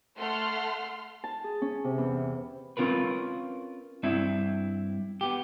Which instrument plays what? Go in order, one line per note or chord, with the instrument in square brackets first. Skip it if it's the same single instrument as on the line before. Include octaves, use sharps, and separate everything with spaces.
[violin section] A3 F#5 C6 F6
[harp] A5
G#4
C#4
C3
E2
[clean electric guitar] C4 C#4 F4 A#4 B4
G2 C4 E4 E5
B3 G4